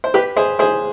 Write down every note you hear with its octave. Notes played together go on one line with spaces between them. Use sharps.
C5
G4 B4
G#4 C5
G#4 C5